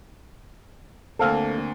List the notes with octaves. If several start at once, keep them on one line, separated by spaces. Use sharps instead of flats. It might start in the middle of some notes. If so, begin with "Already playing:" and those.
D2 A#3 C4 A4 F5